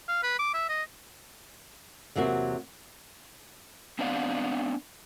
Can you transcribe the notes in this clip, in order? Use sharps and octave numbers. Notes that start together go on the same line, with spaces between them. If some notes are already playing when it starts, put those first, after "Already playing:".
F5
B4
D6
E5
D#5
E2 C3 F#3 A#3 F#4
B3 C4 D4 D5 F5 F#5